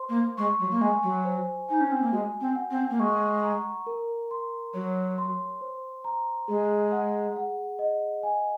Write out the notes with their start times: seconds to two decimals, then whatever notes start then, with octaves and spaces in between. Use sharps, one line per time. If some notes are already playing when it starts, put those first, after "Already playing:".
Already playing: C5 C6
0.09 A#3
0.38 G#3 C#6
0.60 F#3
0.71 A#3
0.81 G#3 G#5
1.03 F#3
1.25 C5
1.69 D#4 G#5
1.81 C#4
1.92 C4
2.02 A#3
2.12 G#3 F#4
2.41 C4
2.55 F#5
2.71 C4
2.90 A#3
2.99 G#3 C#6
3.43 A#5
3.87 A#4
4.31 C6
4.74 F#3 C#5
5.18 C6
5.61 C5
6.04 A#5
6.48 G#3 G#4
6.92 F#5
7.36 F#5
7.79 D#5
8.23 G#5